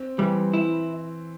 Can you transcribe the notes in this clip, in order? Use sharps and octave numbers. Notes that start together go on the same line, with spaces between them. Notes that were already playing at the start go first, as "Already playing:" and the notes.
Already playing: C4
E3 G3
E4